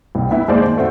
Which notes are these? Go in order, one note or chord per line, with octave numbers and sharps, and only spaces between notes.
C2
B3 E4
D#2 G#3 C5 D5
D#2
A3 C4 F#4